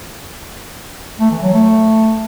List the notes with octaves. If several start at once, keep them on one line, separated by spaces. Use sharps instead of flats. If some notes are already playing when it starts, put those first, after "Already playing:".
A3
E3
F#3
A3